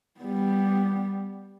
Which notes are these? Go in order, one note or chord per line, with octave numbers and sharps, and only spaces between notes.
G3 B3